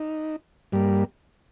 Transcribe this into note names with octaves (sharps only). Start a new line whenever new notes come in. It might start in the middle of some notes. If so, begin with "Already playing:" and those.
Already playing: D#4
G2 G3 A#3